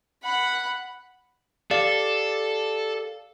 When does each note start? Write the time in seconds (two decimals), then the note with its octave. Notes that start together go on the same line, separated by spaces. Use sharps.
0.23 F#5 B5
1.71 G4 A4 D5 F5